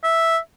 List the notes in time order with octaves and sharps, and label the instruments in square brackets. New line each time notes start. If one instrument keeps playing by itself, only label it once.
[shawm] E5